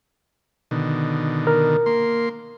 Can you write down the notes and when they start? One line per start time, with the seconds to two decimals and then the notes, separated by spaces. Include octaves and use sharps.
0.71 B2 D3 D#3
1.47 A#4
1.86 A#3 C6